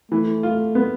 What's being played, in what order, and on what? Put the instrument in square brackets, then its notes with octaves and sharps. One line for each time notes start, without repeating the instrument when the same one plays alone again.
[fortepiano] E3 [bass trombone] A3
[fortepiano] F4
B3